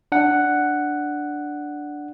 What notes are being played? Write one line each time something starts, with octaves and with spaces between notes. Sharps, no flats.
D4 F#5